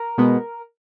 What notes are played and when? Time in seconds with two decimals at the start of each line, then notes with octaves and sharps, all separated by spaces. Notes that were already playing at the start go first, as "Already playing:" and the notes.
Already playing: A#4
0.18 B2 G#3 B3